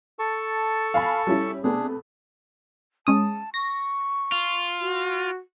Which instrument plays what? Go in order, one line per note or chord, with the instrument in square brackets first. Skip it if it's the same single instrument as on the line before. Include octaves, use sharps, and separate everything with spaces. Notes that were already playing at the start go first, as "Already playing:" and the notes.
[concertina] A4 A5 C#6
[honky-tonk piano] F5 G#5 B5
G3 C#4 E4
[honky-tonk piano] C3 A3 B3 [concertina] D4 G#4
[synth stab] G#3 C#4 D#6 [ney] A5
[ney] C#6 [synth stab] A#6
[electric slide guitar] F4
[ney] F#4